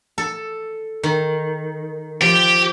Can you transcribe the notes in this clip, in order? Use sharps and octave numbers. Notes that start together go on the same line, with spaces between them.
A4
D#3
F3 G4